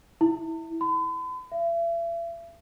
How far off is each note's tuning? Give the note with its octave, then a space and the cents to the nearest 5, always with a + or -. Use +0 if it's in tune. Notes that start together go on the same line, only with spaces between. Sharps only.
E4 -10
B5 +45
E5 +40